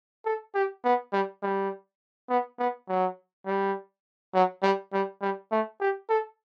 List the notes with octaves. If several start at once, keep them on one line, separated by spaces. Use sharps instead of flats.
A4
G4
B3
G3
G3
B3
B3
F#3
G3
F#3
G3
G3
G3
A3
G4
A4